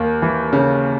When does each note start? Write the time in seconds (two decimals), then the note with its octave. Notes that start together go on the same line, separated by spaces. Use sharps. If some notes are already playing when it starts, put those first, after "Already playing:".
Already playing: D#2 A#3
0.22 E3
0.53 C#3